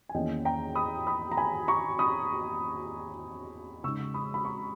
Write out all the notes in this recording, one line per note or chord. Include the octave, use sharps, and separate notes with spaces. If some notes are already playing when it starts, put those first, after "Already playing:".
G#5
E2 D#3 A#3 C#4 D#5 G5
G5 A#5
B5 D#6
B5 D#6
A#5
G#5 B5
A#5 C#6
B5 D#6
C#3 G#3 D#4 C#6 E6
B5 D#6
B5
A#5 C#6